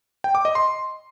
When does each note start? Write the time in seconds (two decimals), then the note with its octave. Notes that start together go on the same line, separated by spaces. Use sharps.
0.24 G5
0.35 D6
0.45 D#5
0.55 C6